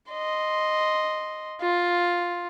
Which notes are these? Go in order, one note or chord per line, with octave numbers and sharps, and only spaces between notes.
D#5 C6
F4